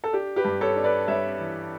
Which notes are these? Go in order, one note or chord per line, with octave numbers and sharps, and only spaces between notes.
A4
D4 G4
G4 B4
G2
A4 C#5
D4
B4 D5
G2 C#5 E5
E3